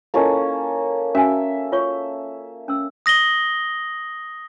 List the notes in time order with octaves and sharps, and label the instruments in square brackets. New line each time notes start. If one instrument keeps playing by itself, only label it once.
[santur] A#3 C#4 A4 [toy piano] E4 F4 D#5
[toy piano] C#4 F#4 G#5 [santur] E5
[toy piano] F4 C#5 C#6
C#4 E6
[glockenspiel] D#6 A#6 F#7 G7